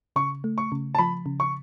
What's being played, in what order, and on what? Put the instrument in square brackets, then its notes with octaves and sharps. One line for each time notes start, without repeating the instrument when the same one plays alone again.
[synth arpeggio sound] C#3 [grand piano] C#6
[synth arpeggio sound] A3
[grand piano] C#6
[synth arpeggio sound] C#3
[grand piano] A5
[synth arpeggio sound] F3 [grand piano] B5
[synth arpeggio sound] C#3
[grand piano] C#6